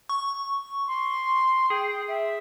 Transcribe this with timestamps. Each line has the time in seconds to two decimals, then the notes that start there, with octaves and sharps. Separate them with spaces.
0.09 C#6
0.87 C6
1.70 G#4 G5
2.08 E5